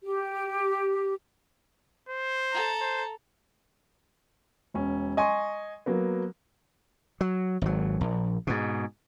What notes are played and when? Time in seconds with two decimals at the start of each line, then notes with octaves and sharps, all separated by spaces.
0.04 G4
2.09 C5
2.51 A4 A#5
2.81 C5
4.74 E1 C#4
5.17 D#5 G#5 C6 C#6
5.86 F#3 A#3 B3
7.21 F#3
7.62 G#1 F#3
8.01 A#1
8.47 G#2 B2